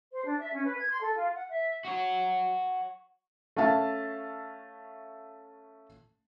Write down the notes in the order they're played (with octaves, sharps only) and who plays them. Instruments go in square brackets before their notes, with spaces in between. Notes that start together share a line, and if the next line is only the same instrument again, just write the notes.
[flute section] C5
D4
E5
C#4
B4
G#6
C6
A4
F4
F#5
E5
[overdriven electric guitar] F#4 C#5
[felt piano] A3 C#4 E5 F5 A5